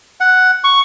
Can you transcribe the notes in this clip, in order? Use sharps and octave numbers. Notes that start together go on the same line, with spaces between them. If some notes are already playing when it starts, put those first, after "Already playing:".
F#5
C#6